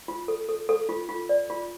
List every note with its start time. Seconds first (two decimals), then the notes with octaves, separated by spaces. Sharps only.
0.08 F4
0.28 A4
0.49 A4
0.69 A4
0.89 F4
1.09 F4
1.29 D5
1.50 F4